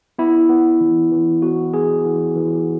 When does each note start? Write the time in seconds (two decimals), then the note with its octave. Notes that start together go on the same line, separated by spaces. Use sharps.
0.18 B3 E4
0.49 B3
0.81 E3
1.12 E3
1.42 B3 F#4
1.74 B3 G#4
2.05 E3
2.35 E3